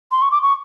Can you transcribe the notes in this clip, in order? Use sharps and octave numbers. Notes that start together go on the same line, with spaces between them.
C6
C#6
D6
C#6